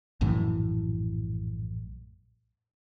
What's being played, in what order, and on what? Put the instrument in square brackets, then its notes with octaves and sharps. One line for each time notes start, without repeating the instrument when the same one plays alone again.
[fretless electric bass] A#1 F#2 A2 E3